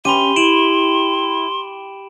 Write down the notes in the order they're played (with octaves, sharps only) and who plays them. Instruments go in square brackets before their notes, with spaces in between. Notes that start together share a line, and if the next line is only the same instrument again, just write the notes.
[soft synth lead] C#4 [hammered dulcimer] G4 [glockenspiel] B5 D#7 [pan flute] C6
[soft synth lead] E4 [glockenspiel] D7 E7 F#7